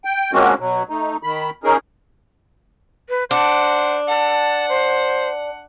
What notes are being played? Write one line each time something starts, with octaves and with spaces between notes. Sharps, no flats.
G5
F3 G#3 A#3 C4 C#4 F#4
B2 F#3
A3 D#4
D#3 B5
C#4 D#4 G#4 A#4
B4
D4 C5 F#5
F#5 A5
C5